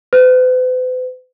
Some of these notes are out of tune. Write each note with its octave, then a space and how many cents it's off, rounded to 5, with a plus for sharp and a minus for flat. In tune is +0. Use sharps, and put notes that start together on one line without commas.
B4 +45